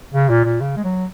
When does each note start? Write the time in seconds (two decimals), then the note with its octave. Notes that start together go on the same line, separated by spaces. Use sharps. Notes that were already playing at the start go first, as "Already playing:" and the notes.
0.14 C#3
0.29 A#2
0.45 A#2
0.61 C#3
0.77 G#3
0.84 F#3